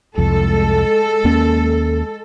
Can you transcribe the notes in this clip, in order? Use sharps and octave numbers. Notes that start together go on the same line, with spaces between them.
C2 F2 G#3 A4
D#2 A#3 C#4